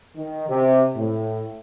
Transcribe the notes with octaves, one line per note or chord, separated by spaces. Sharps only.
D#3
C3
A2